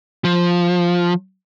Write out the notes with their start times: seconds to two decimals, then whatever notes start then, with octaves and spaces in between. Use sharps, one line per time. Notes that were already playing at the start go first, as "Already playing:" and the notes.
0.25 F3